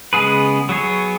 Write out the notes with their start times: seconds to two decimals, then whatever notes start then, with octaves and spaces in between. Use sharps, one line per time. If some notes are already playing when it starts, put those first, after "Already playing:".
0.13 C#3 G#3 B3 G#4 B4
0.69 F#3 B3 G#4 C#5